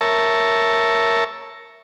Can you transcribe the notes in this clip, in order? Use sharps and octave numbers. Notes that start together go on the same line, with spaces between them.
A#4 C#5 E5 A5